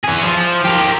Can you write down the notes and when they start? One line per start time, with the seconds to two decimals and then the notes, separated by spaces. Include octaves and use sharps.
0.04 E3 G#4
0.24 F3
0.65 G4 A#4